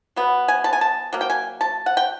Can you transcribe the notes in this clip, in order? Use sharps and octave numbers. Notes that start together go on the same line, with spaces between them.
F#3 B3
G#5
A5
G#5
A5
F#3 A#3
G5
G#5
A5
F#5
G5